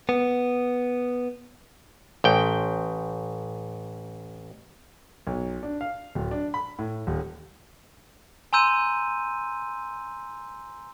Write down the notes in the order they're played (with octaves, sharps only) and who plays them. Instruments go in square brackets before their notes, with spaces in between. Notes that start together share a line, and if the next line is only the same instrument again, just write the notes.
[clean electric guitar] B3
[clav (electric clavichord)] A1 G5
[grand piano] B1
D4
F5
D1
D4
B5
A2
D#1
[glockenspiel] G#5 A#5 C6 E6 G6 D#7